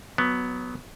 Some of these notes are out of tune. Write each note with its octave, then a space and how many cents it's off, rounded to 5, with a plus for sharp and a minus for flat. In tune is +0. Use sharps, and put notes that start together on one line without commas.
F#3 +0 B3 +0